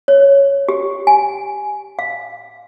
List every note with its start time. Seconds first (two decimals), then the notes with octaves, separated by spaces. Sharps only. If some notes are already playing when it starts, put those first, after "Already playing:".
0.08 C#5
0.69 G4
1.07 G#5
1.99 F5